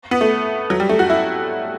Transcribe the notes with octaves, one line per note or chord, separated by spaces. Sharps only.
B3
A3
F#3
G3
A3
F#4
E4